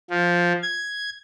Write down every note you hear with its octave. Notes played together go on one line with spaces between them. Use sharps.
F3
G#6